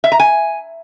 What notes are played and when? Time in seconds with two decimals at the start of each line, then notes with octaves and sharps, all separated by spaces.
0.04 E5
0.12 A#5
0.20 G#5